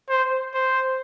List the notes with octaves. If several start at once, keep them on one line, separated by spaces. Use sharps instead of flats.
C5
C5